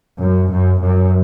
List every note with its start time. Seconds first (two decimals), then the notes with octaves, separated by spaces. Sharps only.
0.21 F#2
0.52 F#2
0.83 F#2